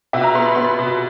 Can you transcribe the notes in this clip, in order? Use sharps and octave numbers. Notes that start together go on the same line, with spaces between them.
B2 E5
A#5
B3 C6
B5
B3 C6
B5
B2